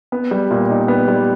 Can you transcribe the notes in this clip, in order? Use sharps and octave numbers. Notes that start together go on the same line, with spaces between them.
B3
G3
A#2
D#4
B3
G3